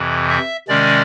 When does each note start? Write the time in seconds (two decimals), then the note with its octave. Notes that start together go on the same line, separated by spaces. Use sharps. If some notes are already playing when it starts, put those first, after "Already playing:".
Already playing: F2 C3 E3
0.30 E5
0.68 C3 D#3 G#3 C#4 D5